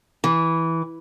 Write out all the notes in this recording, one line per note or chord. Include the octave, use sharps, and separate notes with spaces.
E3